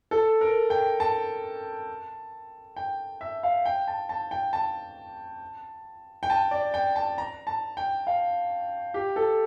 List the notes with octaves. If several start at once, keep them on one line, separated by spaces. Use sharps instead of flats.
A4
A#4
G5
A5
G5
E5
F5
G5
A5
A5
G5
A5
G5
A5
D5
G5
A5
A#5
A5
G5
F5
G4
A4